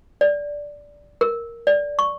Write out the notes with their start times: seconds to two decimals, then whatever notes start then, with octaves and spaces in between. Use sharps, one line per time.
0.21 D5
1.21 A#4
1.67 D5
1.99 C#6